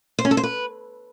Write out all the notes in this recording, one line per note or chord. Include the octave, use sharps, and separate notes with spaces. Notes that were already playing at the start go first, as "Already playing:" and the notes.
C5
C#4
A4
C5
B4